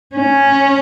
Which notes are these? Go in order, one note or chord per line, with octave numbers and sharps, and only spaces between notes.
C#4